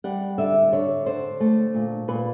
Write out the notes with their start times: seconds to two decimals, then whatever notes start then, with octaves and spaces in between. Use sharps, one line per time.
0.04 G3 F#5
0.38 D3 E5
0.73 D3 C#5
1.06 D3 C5
1.40 A3
1.75 A#2
2.08 A#2 B4